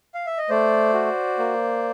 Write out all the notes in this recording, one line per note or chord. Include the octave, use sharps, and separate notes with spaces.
F5
E5
D#5
A3 C5 D5
F#4
A#3